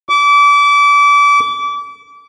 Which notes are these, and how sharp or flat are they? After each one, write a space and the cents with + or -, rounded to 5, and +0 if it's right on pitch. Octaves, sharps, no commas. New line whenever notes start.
D6 -30